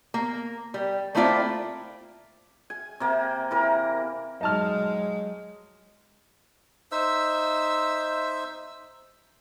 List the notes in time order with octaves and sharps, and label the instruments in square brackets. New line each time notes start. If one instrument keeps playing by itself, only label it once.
[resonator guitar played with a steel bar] A#3
G3
A3 A#3 C4 E4 F4 D5
[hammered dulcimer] G#5
C3 A#3
E3 A#4
[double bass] F#3 G#3 [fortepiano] D#4 A5 F6
[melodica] D#4 C5 E5 E6